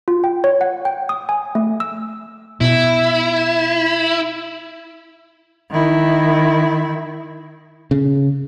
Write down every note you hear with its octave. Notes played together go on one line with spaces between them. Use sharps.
F4
G5
C#5
F#5
G5
D#6
G#5
A3
E6
B2 E4
D#3 E4
C#3